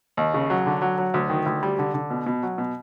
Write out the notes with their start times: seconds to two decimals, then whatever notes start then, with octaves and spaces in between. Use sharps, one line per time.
0.17 D#2
0.34 C#3
0.50 F#3
0.66 D3
0.82 F#3
0.98 F#3
1.14 D2
1.30 D#3
1.46 D2
1.63 G3
1.79 D3
1.94 D3
2.10 B2
2.26 B2
2.43 F#3
2.58 B2